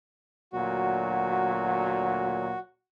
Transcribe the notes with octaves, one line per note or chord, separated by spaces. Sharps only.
D2 A#2 F#3 F#4